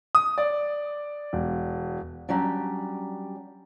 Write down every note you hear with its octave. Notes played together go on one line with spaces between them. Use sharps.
D#6
D5
E1
F#3 G3 C#4 D4